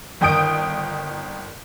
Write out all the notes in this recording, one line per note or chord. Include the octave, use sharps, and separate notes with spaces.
G1 D#3 G5 D#6 G6 D7